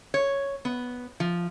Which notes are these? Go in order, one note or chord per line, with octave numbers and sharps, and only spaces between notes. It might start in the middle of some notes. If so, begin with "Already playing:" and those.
C#5
B3
F3